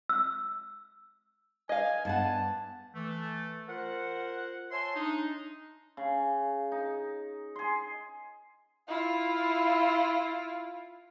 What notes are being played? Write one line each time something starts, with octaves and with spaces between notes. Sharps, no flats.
E6
D#5 F5 G#5
G2 B3 F#5 A5
E3 A3
F4 A#4 C5 F#5
C#5 E5 G#5 A5 C6
D4 D#4
C#3
D#4
G#4 C6
E4 F4